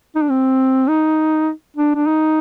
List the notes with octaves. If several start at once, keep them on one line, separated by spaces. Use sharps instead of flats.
D#4
D4
C4
D#4
D4
D4
D#4